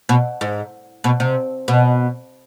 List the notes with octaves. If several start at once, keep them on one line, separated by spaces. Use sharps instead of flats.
B2
G#2
B2
C3
B2